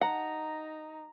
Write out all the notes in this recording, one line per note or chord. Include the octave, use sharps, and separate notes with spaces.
D#4 F#5 A#5